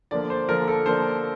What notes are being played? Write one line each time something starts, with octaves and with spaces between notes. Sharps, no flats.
D3 F3 A#3 D4 D5
C5
D3 F3 A#3 D4 A#4
A4
D3 F3 A#3 D4 C5